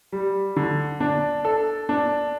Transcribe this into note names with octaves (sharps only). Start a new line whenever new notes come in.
G3
D3
D4
A4
D4